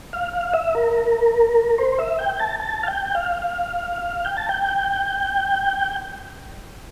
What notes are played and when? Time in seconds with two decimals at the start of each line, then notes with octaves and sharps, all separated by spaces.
0.13 F5
0.33 F5
0.54 E5
0.75 A#4
1.78 C5
1.99 E5
2.19 G5
2.39 A5
2.60 A5
2.83 F5
2.87 G5
3.15 F5
3.42 F5
4.25 G5
4.37 A5
4.49 G5